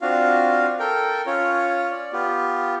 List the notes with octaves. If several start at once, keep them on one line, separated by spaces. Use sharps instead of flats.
C4 D4 F4 F#4 F5
A4 A#4 G5
C#4 F4 C#5
D5
B3 F4 G4